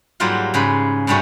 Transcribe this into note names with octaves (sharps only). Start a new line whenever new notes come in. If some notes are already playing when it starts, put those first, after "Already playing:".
G#2 F#3 G3 A#3 F4 F#5
G#2 C#3 G#4 B4 B5
G2 C3 G3 A3 C#4 F#4